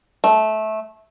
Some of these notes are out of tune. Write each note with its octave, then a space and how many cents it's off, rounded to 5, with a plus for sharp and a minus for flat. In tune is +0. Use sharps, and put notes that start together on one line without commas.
A3 -20